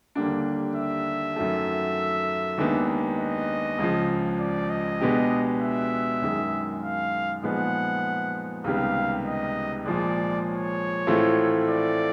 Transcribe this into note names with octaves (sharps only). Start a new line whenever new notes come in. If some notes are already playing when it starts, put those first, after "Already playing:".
D#2 D3 G3 A#3 D4
E5
F#2 D#3 F#3 A3
D#2 D#3 G#3 B3 D4
D#5
C#2 C#3 F3
D5
D#5
B2 G#3 B3 D4 G4
E5
F#2 D#3 G#3
F5
A#2 F3 G#3 B3 D#4 F#5
C#2 C3 D#3 G3 B3 F5
D#5
A#2 F3 G#3 D5
C#5
A2 E3 A3 C4 F4
D5